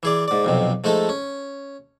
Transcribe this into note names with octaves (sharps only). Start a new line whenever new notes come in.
E3 G#4 D5
G#2 D5
B1 F2 C3
F3 G#3 A3 D#4 A4
C#4